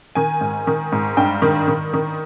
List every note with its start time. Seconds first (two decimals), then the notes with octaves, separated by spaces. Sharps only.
0.15 D#3 G#5
0.41 G#2
0.67 D#3
0.92 G#2
1.17 G2 G5
1.42 D#3
1.68 D#3
1.94 D#3